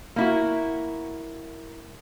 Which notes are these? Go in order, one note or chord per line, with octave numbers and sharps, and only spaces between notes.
A#3 E4 F#4